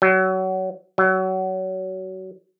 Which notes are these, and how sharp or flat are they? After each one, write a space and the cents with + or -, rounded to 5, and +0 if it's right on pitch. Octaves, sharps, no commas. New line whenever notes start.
F#3 +25
F#3 +25